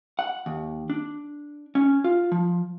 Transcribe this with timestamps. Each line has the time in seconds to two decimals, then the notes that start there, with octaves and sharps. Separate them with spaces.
0.19 F#5
0.46 D#2
0.90 D4
1.75 C#4
2.04 F4
2.32 F3